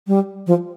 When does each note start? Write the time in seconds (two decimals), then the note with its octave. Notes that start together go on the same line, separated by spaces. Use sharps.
0.08 G3
0.47 F3